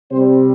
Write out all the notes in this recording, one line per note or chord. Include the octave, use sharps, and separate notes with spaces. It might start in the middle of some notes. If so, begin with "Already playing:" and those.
C3 G3 C4 C5